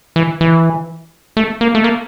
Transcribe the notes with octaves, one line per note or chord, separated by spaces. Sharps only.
E3
E3
A3
A#3
A3
A#3